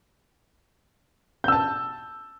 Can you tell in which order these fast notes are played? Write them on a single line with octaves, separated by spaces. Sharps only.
G6 E6 A5